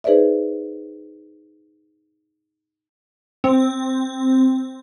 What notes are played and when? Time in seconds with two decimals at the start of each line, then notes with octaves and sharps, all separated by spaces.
0.04 D#4 G#4 B4 C5 D5 E5
3.44 C4